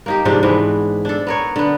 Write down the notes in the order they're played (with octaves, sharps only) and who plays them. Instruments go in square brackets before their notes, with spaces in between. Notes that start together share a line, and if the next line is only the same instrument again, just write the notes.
[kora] A#3 D#4 G4
G#2 C3 F3 D4
G#2 E3 B3
D4 A4
B3 A#4 C#5
D3 B3